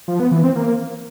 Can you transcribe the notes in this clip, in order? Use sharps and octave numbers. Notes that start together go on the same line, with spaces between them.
F3
B3
E3
C4
A#3